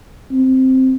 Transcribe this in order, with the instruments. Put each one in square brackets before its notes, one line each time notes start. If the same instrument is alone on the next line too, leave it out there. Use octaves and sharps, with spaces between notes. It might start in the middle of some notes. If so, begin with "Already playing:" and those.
[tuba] C4